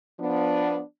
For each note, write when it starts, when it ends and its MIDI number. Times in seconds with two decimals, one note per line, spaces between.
0.20 0.81 53
0.20 0.81 59
0.20 0.81 62